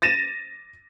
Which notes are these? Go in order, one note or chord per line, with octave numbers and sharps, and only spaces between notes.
A6 A#6 D#7 E7